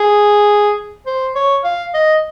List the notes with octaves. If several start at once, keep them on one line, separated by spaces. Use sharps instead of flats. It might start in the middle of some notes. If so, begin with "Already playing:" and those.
Already playing: G#4
C5
C#5
F5
D#5